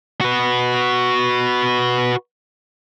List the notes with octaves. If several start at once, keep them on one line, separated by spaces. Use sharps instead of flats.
F#4 B4